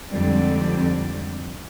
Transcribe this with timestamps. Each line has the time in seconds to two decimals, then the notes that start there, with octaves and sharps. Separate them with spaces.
0.11 F2 G#2 D3 G3 C4 D5